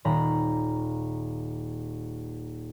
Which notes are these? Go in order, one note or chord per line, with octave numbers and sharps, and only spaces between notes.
D#1 A#5 B5